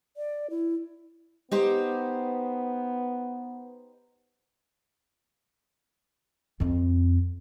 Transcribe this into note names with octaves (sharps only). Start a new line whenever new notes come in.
D5
E4
B3 D#4 G4 C5
F2 C4